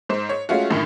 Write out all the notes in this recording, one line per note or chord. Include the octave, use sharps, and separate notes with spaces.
G#2 C5
C#5
G#3 A3 C#4 F4 F#4
F#2 A2 D3 D#3